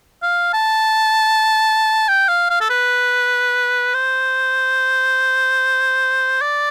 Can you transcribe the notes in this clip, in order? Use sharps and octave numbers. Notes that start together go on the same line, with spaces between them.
F5
A5
G5
F5
F5
A4
B4
C5
D5